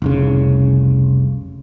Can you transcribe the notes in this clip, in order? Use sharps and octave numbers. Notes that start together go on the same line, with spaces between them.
F1 C2 C#3